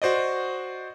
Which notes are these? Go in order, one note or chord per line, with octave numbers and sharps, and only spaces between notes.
F#4 C5 D5 D#5